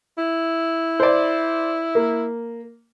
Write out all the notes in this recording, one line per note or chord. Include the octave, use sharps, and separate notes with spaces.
E4
C5 D5
A#3